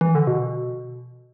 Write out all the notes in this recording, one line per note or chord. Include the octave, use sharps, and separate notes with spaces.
E3
D3
B2